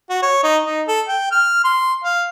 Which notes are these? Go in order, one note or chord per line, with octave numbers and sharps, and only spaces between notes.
F#4
C#5
D#4
D#4
A4
G5
F6
C6
F5